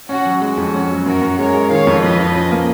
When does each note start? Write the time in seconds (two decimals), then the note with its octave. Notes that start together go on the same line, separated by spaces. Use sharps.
0.09 C#4 F#4
0.25 F#3
0.42 G#3 F#4
0.57 F2
0.74 C#4
0.90 F#3
1.06 F#2 F#4 A#4
1.22 F#2
1.39 G#3 A#4 C#5
1.54 G#3
1.70 D#3 C#5 F5
1.87 F2
2.02 F3 B4 D#5
2.19 F3
2.36 C#4
2.51 A#3